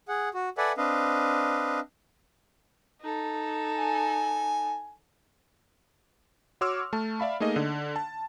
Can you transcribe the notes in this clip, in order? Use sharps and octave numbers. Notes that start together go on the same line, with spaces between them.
G#4 F#5
F#4
A4 B4 D5 E5 F#5 G#5
C4 D4 B4 D#5 F5
D#4 A4
G#5
F#4 C#5 C6 D6 E6 F6
A3 A5
D5 E5 F5 B5
A3 A#3 D#4 G#4 D#5
D3
A5